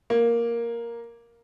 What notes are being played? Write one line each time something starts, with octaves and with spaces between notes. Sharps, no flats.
A#3